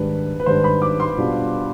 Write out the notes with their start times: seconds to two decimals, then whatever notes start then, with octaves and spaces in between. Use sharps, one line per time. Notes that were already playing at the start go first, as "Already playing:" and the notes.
Already playing: G#2 D#3 G3 D4 B4
0.40 B4
0.46 G#2 D#3 G3 D4 C5
0.64 B5
0.82 D6
1.00 C6
1.18 B2 G3 D4 F4